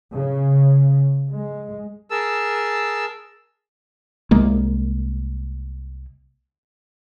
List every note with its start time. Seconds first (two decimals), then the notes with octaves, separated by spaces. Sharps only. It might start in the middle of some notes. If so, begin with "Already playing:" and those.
0.14 C#3
1.33 G#3
2.10 G#4 A#4 A5 E6
4.31 C2 G#3 A#3